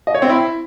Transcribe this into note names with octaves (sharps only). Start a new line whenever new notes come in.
D#5
C#5
C4
E4